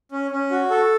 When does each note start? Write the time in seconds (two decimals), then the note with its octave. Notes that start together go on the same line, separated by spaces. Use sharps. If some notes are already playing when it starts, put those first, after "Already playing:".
0.12 C#4
0.31 C#4
0.51 F#4
0.70 A4